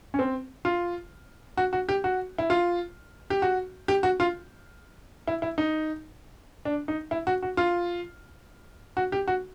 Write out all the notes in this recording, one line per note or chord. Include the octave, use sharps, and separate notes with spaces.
C#4
C4
F4
F#4
F#4
G4
F#4
E4
F4
G4
F#4
G4
F#4
F4
E4
E4
D#4
D4
D#4
E4
F#4
F#4
F4
F#4
G4
F#4